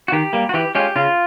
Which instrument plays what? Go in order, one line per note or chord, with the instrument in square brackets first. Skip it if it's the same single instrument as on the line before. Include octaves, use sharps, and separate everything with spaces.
[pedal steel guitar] F#4
D#3 G4
G3 A#3
F#4
E3 G4
G#3 C#4 F4 G4
C#3 F4